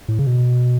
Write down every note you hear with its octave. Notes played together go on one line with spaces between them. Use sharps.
A2
C#3
B2